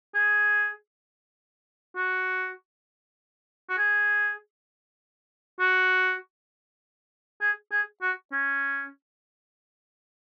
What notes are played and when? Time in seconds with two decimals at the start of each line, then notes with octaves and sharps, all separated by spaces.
0.15 G#4
1.96 F#4
3.69 F#4
3.78 G#4
5.60 F#4
7.41 G#4
7.72 G#4
8.02 F#4
8.32 C#4